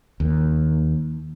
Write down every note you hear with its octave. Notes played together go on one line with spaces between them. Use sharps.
D#2